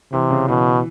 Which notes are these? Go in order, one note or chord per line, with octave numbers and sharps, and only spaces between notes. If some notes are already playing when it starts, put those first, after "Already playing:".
C3 E3
C#3
B2 E3